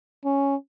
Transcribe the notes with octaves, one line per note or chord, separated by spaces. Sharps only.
C#4